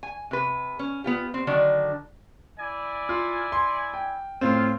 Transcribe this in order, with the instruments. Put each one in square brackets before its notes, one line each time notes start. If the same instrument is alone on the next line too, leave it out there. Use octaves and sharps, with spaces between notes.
[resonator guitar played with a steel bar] G#5
C3 B4
C#4
B3 F4 G4
C4
D3 D#3 F#3 D4
[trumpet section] E4 D5 G#5
[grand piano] F4
C6
G5
[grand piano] A2 C4 [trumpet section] F4